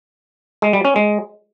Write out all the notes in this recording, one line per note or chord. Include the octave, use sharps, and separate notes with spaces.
G#3
G3
C#4
G#3